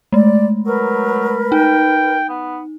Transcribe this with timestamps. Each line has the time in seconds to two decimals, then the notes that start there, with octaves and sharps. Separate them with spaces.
0.13 G#3 A3 D5
0.66 F#3 A#4 B4
1.52 D#4 G5
2.29 B3